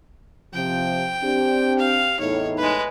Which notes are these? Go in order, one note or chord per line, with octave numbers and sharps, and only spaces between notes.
C3 F3 G5
C4 D4 G4
F5
E2 A2 D#4 C#5
G#3 B4